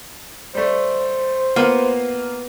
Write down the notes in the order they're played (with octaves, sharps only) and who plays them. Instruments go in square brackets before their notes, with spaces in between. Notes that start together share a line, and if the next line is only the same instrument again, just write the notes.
[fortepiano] G3 A3 [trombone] C5
[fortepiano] A#3 F4 F5 [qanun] B3